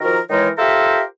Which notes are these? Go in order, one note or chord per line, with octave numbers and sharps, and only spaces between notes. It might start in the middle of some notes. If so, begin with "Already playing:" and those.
D#3 F3 F#4 A#4
D#3 E3 G#3 D#4 A#4 C#5
F4 G4 A4 A#4 C5 E5